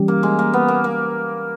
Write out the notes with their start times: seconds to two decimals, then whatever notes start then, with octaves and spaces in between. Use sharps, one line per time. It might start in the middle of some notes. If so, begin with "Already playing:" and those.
Already playing: E3 G3 C#4 G4
0.08 A#3
0.23 G#3
0.39 A#3
0.54 B3
0.68 A#3
0.84 A#3